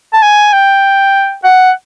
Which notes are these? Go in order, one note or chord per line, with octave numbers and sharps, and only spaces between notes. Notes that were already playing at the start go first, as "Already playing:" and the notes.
A5
G#5
G5
F#5